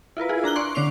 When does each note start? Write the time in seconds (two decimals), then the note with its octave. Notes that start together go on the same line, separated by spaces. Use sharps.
0.17 E4 F4 A#4 B4
0.29 E4 F4 G#4
0.44 D4 A#5 F#6 G7
0.56 D5 C6 C#6 F#6
0.75 D3 C#4 D6 C7 F7